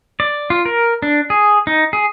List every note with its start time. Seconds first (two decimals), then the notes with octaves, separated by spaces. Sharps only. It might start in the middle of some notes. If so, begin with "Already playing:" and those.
0.20 D5
0.50 F4
0.65 A#4
1.02 D4
1.30 G#4
1.67 D#4
1.93 G#4